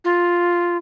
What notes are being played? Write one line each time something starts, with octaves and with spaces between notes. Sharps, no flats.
F4